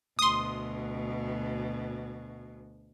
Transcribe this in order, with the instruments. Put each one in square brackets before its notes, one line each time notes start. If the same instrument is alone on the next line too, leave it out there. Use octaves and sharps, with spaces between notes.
[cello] D2 B2 [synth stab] C6 D#6